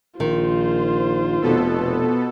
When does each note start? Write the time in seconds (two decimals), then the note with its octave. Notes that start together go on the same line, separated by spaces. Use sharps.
0.20 A#1 D#3 F4 C5
1.42 F1 B2 B3 A4